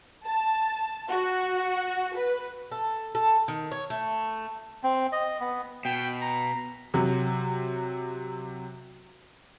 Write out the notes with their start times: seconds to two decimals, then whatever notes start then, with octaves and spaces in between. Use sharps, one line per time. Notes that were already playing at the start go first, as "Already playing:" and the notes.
0.24 A5
1.10 F#4
2.17 B4
2.72 A4
3.15 A4
3.48 D#3
3.71 C#5
3.90 A3
4.83 C4
5.12 D#5
5.40 B3
5.85 B2 G5
6.22 A#5
6.94 C3 F#3